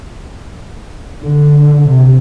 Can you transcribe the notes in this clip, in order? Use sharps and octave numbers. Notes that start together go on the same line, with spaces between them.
D3
C3